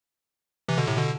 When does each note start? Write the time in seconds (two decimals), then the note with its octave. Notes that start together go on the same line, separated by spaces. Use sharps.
0.68 C3 E3
0.77 B2 D3
0.88 A2 C3
0.97 B2 D3